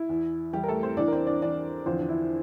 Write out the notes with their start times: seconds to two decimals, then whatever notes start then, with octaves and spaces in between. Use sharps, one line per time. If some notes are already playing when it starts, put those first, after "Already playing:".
Already playing: E4
0.09 E2 E3
0.53 E2 E3 G3 G4
0.64 A#4
0.68 A3 A4
0.83 C4 C5
0.97 E2 E3 D4 D5
1.08 A#4
1.12 C4 C5
1.27 D4 D5
1.42 E2 E3 D4 D5
1.86 E2 D3 F3 C4 C5
2.00 D4
2.09 E4